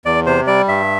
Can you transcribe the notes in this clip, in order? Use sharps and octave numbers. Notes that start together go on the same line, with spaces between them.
E2 D5
C3 C5
G3 D5
G2 E5